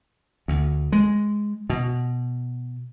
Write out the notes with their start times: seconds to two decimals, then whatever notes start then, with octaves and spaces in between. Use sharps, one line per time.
0.48 D2
0.92 G#3
1.70 B2